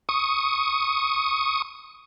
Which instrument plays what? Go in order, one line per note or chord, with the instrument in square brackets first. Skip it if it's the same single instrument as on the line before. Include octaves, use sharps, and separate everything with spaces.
[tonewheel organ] C#6 D#6